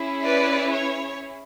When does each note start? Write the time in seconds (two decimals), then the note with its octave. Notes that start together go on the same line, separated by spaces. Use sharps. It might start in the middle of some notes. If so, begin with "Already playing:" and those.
Already playing: C#4 E4 G#4
0.24 B4 D5
0.72 C#5